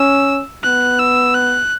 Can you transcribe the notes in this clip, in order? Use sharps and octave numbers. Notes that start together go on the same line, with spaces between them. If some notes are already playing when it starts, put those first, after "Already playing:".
Already playing: C#4 E6
B3 F#6
E6
F#6